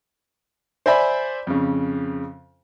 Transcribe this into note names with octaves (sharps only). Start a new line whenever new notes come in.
C5 D5 E5 G#5 B5
F2 C#3